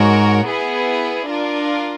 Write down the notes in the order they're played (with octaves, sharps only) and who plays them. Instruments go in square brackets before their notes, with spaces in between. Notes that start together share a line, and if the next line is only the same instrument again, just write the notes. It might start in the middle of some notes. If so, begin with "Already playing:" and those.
Already playing: [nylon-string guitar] G#2 [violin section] F#4 A#4 C#5
[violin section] B3 E4 G#4
D4 F4 A#4